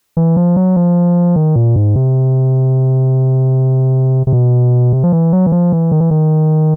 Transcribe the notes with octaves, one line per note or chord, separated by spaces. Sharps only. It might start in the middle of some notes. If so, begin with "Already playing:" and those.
E3
F3
F#3
F3
D#3
A#2
G#2
C3
C3
B2
C3
F3
E3
F#3
E3
F3
E3
D#3
E3
D#3